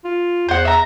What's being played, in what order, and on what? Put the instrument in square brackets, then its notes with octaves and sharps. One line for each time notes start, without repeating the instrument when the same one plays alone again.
[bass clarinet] F4
[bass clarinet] E2 [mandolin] C5 F#5
[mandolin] E5 A#5